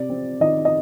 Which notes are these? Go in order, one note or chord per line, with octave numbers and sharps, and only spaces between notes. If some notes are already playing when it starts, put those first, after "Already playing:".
Already playing: C3 D5
C4
D#3 D#5
D#5